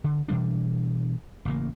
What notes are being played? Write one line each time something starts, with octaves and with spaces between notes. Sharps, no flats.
D3
B2 E3 G3 D4
A1 C#3 A#3